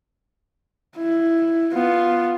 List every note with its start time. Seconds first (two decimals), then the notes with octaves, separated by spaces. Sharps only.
0.97 E4
1.74 B3 F4